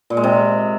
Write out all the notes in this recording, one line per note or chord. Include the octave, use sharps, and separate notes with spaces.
A#2
G#3
C3